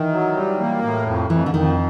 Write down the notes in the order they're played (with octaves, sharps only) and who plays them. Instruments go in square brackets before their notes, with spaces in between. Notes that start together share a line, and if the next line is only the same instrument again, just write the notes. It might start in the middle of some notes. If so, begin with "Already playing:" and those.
Already playing: [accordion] D#3 [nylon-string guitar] E3
[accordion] F#3
G3
A#3
A2
F2
[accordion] F2 [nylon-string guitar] E3
[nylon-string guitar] D3
[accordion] F2 [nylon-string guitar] D#3